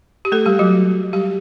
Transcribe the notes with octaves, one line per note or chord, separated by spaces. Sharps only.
G4
A3 A4
G3 G4
F#3 F#4
G3 G4